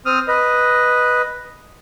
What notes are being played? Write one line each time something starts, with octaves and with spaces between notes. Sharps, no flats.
C4 D#6 F6
B4 D#5